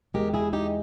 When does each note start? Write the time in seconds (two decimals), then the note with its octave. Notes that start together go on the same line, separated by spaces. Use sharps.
0.14 B2 G#3 G4 A#4
0.19 E2
0.34 E4 G#4
0.53 D#4 G4